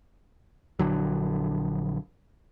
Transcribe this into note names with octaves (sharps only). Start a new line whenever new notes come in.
A#1 D3 F#3